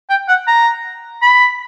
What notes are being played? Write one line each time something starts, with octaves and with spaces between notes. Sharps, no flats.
G5
F#5
A#5
B5